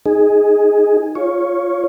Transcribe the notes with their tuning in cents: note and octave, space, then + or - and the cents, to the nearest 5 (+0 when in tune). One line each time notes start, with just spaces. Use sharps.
D#4 +5 G#4 +0
F4 +0 C#5 +0